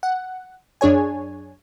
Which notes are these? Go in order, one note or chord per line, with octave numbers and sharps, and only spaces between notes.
F#5
F#2 D4 G#4 C#5 G#5